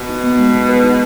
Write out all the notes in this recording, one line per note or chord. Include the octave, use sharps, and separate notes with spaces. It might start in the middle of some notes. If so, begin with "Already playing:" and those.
Already playing: B2
D#4
B3
G#3
B3
B4
D#4